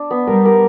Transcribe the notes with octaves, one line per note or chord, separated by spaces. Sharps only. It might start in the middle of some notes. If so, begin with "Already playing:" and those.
Already playing: D4
B3
G3 A#4
A#4